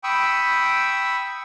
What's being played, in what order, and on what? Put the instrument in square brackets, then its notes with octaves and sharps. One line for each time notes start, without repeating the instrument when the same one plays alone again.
[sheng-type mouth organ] G5 B5 C#6 D#6 E6